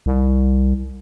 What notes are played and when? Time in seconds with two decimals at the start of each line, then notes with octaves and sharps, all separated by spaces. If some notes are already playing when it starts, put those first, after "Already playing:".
0.06 C2